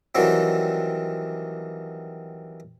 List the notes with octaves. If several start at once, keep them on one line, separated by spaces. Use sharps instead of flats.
D#3 E3 F#3 G3 C4